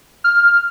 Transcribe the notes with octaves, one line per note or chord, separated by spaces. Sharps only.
F6